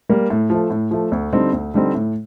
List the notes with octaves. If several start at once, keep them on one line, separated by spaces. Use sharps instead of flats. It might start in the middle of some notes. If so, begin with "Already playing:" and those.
G3 A#3
A2
F3 A3
A2
F3 A3
D2
D3 G3 C4 D#4
D2
D3 G3 C4 D#4
A2